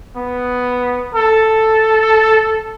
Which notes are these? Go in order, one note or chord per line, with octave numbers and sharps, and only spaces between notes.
B3
A4